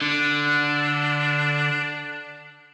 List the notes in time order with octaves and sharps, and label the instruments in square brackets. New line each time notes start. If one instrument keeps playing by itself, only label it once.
[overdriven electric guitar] D3 [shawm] D4